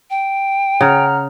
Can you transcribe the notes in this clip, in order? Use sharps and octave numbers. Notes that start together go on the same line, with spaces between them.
G5
C#3 F#5 A#5 F6